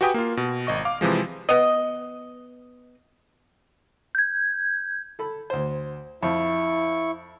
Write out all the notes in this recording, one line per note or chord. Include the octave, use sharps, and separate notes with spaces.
F#4 G4 B4 G5 G#5 D#6
A#3 F4
B2
G#1 D#5 C#6
F5 D6
C3 E3 F3 G#3
B3 D#5
G6 G#6
A4 B5
D2 C5
F2 E4 C#6